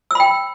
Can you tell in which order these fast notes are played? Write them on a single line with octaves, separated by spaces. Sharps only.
E6 B5 G5